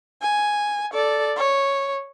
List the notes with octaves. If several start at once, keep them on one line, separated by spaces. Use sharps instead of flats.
G#5
A4 D5
C#5